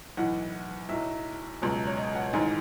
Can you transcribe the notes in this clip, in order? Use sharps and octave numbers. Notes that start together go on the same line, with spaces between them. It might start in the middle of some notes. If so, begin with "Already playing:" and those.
B1 A2 E3 F#5
B1 A2 F#3 E5
C#2 B2 F#3
C#5
D#5
F#5
A1 G#2 D#3 G#5